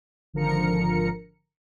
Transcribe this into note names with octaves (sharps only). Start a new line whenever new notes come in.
G#1 D3 F3 A#4 A#5 C#7